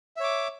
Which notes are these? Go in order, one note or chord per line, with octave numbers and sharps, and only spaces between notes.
C#5 E5 D6